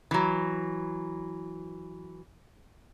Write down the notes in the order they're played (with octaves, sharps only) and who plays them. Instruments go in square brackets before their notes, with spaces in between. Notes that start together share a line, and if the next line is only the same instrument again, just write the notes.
[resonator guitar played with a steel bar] E3 F#3